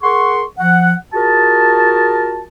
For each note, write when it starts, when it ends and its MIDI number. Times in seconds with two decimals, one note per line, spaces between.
0.03 0.43 68
0.03 0.43 70
0.03 0.43 78
0.03 0.43 84
0.03 0.43 85
0.59 0.93 53
0.59 0.93 78
1.14 2.43 65
1.14 2.43 66
1.14 2.43 68
1.14 2.43 70
1.14 2.43 81